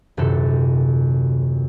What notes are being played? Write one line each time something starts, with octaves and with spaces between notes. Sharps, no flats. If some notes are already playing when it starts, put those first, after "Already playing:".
D#1 F#2 C3 A4